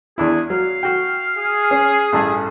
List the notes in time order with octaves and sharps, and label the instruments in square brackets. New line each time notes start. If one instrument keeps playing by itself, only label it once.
[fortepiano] E2 D4 E4 [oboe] G#4
[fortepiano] F#3 [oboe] F5
[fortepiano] F#4 G5
[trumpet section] G#4
[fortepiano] C#4
A1 G2 A4